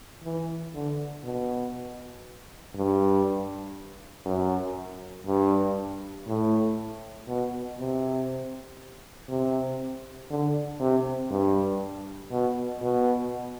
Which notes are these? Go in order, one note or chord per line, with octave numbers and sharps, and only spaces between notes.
E3
D3
B2
G2
F#2
G2
A2
B2
C3
C3
D3
C3
G2
B2
B2